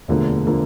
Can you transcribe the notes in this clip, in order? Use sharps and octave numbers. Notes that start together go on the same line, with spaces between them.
E1 D2 D3 F3 A#3
D3 F3 A#3